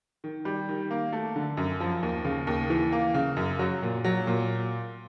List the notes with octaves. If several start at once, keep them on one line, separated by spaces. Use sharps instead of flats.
D#3
G3
D#3
A#3
A3
D3
F#2
F3
D#2
C#3
D#2
E3
A#3
C#3
F#2
F#3
A#2
F#3
A#2